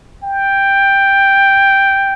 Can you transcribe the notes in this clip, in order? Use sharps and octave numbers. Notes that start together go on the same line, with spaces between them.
G5